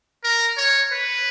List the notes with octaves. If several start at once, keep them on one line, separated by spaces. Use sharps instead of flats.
A#4
C#5
B4